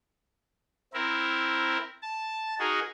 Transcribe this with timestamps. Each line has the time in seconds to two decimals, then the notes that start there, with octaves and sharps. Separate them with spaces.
0.93 C4 E4 A#4
2.02 A5
2.59 D#4 F#4 G#4 A#4